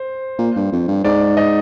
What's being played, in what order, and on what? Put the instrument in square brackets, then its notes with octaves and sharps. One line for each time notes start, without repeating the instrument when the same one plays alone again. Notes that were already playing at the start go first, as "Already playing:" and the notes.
Already playing: [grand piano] C5
[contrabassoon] A#2
G2
F2
G2
[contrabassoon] G#2 [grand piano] D5
[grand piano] D#5